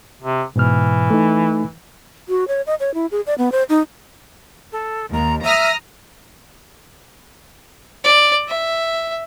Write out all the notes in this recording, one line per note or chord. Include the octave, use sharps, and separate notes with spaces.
C3
G#2 B2 E3 F6
A3 D#4
F#4
C#5
D#5
C#5
E4
G#4
D5
B3
C5
D#4
A4
D#2 A#5
E5 A#5 D#6 F6
D5
E5